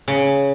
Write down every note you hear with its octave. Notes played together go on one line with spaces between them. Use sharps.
C#3